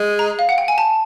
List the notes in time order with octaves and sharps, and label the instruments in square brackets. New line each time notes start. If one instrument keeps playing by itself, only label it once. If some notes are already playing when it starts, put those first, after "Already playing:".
Already playing: [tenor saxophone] G#3
[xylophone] A#5
F5
F#5
G5
G#5
A5